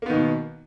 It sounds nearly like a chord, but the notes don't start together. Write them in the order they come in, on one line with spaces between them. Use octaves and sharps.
A#3 B3 D#3 B2